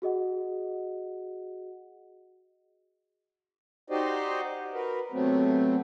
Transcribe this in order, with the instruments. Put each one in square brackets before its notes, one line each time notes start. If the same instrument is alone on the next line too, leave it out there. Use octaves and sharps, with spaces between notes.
[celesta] F#4 G#4 D#5 F#5
[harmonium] D#4 F#4 G4 C5 D5 D#5
F#4 A#4 B4
C3 F#3 A3 B3 C4